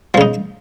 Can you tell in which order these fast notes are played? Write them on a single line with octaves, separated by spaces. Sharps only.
F3 C#3 D#4